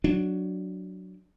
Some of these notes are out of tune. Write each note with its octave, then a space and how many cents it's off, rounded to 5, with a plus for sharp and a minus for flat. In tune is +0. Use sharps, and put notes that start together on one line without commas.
F#3 +0 D4 +0